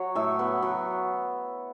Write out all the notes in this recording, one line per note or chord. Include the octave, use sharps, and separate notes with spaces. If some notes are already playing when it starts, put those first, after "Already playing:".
Already playing: F#3 C#5
A2 E5
B3
F#3